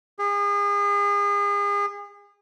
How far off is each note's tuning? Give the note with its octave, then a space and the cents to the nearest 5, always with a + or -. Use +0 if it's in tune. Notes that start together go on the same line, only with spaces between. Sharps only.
G#4 -35